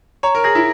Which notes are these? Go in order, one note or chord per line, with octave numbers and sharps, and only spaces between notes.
C#5 A#5
A#4
G#4 A#6
E4